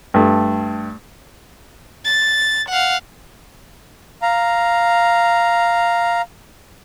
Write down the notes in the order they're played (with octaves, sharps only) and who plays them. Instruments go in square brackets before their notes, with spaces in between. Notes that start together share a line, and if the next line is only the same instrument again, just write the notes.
[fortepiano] G2 A3
[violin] A6
F5 F#5
[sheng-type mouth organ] F5 A#5